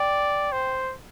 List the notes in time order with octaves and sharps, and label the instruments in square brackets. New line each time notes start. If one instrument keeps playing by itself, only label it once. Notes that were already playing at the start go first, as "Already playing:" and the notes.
Already playing: [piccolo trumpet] D5 [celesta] G5
[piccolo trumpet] C5